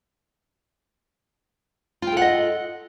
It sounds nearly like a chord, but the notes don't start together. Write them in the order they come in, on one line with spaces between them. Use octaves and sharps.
F4 G5 A4 F#5 D#5